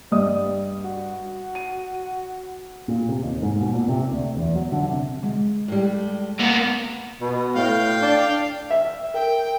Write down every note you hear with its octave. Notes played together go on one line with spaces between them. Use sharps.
G2 G3 D#5 D#6
F#4
D#7
A#2
C3
D#2
G#2
B2
A#2
C3
D2
E2
F#3
D3
C3
G#3
A2 G3
A#3 B3
B2
A2 F5 G5
D4
E5
A#4 G5